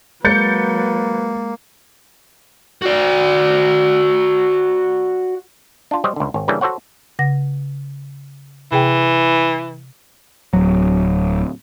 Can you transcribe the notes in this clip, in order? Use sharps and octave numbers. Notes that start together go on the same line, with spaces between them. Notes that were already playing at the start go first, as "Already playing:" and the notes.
F#3 G#3 A#3 B4 G6 A6 C#7
F#4 D5
D4 F4
F#3 G3 C5 C#5 D#5
C#2 D3
G#1 C#5
C#3 E3 G3 A#3 C#4 D4
F#4 A4 C5 C#5 F#5
C#3 F#5 A#6
C3 E3 G#4 G5
D1 F#3